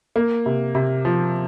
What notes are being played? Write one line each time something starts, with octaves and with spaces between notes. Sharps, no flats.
A#3
C3
C3
F3